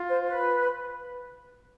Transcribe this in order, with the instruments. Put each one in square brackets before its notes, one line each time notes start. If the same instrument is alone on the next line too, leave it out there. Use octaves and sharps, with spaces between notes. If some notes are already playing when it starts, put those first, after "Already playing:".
Already playing: [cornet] F4
[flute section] C5
B4